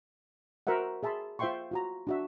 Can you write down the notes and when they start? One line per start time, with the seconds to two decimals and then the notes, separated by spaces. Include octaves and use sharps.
0.67 F#4 A#4 C5 E5 F#5
1.03 G#4 E5 A5 B5 C6
1.39 F4 C5 E5 G5 C6 C#6
1.71 F4 F#4 A#5
2.07 D4 F#4 E5